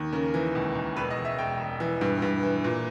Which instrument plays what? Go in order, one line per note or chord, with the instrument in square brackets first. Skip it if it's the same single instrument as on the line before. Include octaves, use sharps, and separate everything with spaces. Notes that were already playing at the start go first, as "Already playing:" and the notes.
Already playing: [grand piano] D#2
C#3 A#4
E3
C#2
C#2
E1 B4
D#5
E1
E5
E1 G5
E1
E3
G2
G2
E3
A#2